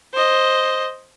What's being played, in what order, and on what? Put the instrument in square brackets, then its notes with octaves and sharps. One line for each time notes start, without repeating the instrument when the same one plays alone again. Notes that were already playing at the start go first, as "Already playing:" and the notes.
[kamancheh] C5 D#5